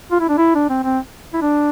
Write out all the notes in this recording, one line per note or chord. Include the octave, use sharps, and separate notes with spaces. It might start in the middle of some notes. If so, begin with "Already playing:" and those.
F4
E4
D4
E4
D4
C4
C4
E4
D4